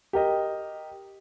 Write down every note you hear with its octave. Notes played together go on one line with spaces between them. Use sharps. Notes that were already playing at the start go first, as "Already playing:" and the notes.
G4 A#4 D#5